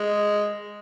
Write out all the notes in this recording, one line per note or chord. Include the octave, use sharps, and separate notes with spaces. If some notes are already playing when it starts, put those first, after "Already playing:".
Already playing: G#3